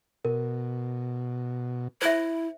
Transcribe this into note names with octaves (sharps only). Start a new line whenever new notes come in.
B2 A#4
E4 C5 E5